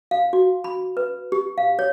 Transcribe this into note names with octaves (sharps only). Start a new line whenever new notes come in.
F5
F#4
B5
B4
G4
F5
C#5